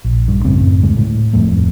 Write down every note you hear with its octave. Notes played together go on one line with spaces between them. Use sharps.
A#1
G2
F#2 A2 C#3 C4
D2 G#3
A2
D1 F2 A2 A3